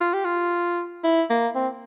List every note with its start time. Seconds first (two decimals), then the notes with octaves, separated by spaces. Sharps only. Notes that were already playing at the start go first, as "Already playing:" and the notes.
0.01 F4
0.13 G4
0.25 F4
1.04 E4
1.30 A#3
1.55 C4